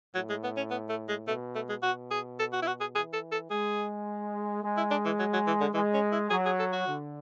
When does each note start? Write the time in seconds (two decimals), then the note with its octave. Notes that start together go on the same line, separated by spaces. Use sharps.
0.15 A2 F#3
0.29 G#3
0.44 B3
0.57 C#4
0.70 B3
0.89 A3
1.09 G#3
1.27 B2 A3
1.55 A3
1.69 G#3
1.83 B2 F#4
2.11 G#4
2.39 A4
2.53 F#4
2.62 E4
2.67 F#4
2.80 G#4
2.95 E3 G#4
3.13 A4
3.32 A4
3.50 G#3 G#4
4.62 G#3
4.77 E4
4.91 D4
5.05 E3
5.19 F#3
5.33 F#3
5.47 E3
5.61 D3
5.74 E3 G#3
5.94 C#4
6.12 E4
6.30 F#3 G#4
6.45 G#4
6.59 A4
6.73 F#4
6.87 D3